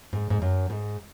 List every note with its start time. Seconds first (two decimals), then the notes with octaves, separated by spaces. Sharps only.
0.13 G#2
0.30 G#2
0.42 F#2
0.70 G#2